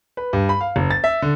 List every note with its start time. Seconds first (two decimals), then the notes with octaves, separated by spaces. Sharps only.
0.17 B4
0.33 G2
0.49 B5
0.61 F5
0.76 F#1
0.91 A6
1.04 E5
1.22 D3